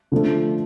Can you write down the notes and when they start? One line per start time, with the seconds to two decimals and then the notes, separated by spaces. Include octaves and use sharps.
0.12 D3 F3 A3